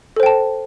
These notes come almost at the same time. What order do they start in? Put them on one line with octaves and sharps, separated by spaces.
A4 C5 G5 A5